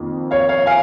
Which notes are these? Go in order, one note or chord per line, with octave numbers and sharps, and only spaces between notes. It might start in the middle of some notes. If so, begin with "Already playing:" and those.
Already playing: F2 D#3 A#3
C#5 F5
C#5 F5
F5 G#5